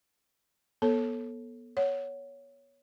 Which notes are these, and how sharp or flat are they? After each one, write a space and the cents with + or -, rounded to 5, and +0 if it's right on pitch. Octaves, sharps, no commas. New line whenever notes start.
B3 -30 A4 +0 C#5 -15
C#5 +5 F#5 +0